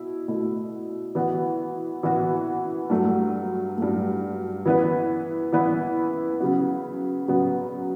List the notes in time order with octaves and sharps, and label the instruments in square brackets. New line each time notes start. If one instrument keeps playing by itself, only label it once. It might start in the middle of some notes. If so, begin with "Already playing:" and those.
Already playing: [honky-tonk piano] B2 E4
B2 A3 E4
E3 B3 F#4
E3 B3 F#4
G2 F#3 A3
G2 F#3 A3
E3 B3 E4 B4
E3 B3 E4 B4
C#3 F#3 B3
C#3 F#3 B3